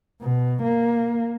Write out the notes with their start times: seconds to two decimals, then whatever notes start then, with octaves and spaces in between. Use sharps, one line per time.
0.22 B2
0.63 A#3